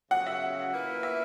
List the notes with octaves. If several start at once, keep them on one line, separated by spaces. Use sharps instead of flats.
F#2 C#3 F#3 F#5
E5
A#2 A#3 E4 B4
E5